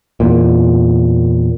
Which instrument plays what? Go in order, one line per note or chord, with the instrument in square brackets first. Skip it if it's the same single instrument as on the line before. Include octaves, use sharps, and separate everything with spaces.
[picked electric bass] E2 A#2